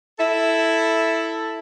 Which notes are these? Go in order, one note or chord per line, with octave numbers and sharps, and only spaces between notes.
E4 A4 E5